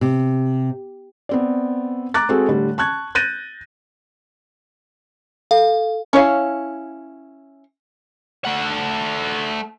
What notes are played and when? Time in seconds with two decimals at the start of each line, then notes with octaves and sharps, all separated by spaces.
0.01 C3
1.29 B3 C4 D5
2.14 A#5 D6 F#6 A6
2.29 G#3 C4 F#4 G#4 A4
2.48 A2 D3 G3
2.78 A5 C#6 F#6 G#6
3.15 F#6 G6 A6 A#6 D#7
5.51 A4 F5
6.13 C#4 E4 C#5 E5 F5
8.45 A3 F#5